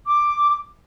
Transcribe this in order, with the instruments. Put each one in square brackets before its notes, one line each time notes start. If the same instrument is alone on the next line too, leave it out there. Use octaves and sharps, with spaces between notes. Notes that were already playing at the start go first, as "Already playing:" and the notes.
[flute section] D6